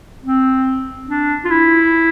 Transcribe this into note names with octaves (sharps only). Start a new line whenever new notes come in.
C4
D4
F4
E4